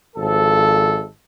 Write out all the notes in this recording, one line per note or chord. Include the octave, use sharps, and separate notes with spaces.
G#1 F3 A4